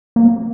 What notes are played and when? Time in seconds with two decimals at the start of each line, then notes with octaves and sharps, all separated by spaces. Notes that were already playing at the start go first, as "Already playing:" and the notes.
0.16 A#3